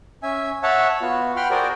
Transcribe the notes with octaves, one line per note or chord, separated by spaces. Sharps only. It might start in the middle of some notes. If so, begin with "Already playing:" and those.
C#4 E5 G#5
C#5 E5 F#5 A5
B3 F4 F#4
F#5 G5 B5 C6 F6
F#4 G#4 A#4 C5 D5 G5